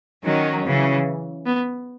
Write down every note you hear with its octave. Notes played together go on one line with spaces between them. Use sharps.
D#3 F#3 C#4
C#3 E3
B3